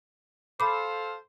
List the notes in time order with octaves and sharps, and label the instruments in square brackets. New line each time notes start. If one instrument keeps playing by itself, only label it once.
[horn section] A4 C5 F5 [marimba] B5 D6